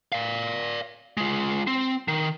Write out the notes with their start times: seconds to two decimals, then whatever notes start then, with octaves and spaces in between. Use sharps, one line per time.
0.12 D5 F5
1.17 G#3 F4
1.67 C4
2.08 D#3